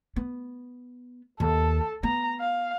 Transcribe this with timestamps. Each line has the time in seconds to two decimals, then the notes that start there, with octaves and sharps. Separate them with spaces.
0.16 B3
1.40 D#2 A4
2.03 B3 A#5
2.40 F5